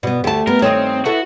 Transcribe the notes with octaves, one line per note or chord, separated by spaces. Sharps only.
B2 B3 D5
D2 A3 G4 A5
B3 A#4
G2 D#3 C4 C#5 D#5
B3 E4 F#4 A4